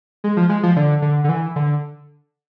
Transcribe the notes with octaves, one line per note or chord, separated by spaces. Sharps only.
G#3
F3
G#3
F3
D3
D3
D3
E3
D3